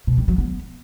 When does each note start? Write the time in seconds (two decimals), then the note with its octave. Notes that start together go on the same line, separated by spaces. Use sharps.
0.07 B2
0.18 G3
0.28 F#3
0.38 B3